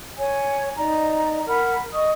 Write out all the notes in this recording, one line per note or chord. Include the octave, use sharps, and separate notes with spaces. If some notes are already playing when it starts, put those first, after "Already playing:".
C#5 G#5
D#4 D5 A#5
A#4 F#5 B5
D#5 C#6 D#6